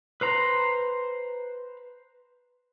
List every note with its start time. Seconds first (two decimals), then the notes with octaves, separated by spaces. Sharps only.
0.21 B4 C5 A#5